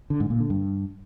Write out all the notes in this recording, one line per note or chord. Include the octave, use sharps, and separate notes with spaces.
D3
G#2
A#2
D3
G2